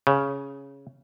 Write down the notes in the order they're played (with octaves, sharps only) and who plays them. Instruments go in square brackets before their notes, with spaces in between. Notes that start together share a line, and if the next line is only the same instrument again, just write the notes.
[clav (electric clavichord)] C#3